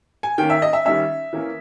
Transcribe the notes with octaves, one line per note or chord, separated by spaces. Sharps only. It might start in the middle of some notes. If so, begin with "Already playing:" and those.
G#5
D#3 A#3 C#4 G5
E5
D#5
E5
D#3 G3 C#4 E5
E3 A#3 C#4